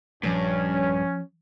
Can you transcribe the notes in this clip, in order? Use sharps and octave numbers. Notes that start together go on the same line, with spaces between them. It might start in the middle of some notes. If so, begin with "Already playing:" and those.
A#1 G2 F3 C#4